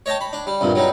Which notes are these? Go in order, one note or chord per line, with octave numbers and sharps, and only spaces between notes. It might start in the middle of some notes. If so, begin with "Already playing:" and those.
C#5 D#5 G5 A5
B5
D4
G3
C2 G2 A#2
F#3 G3 D#4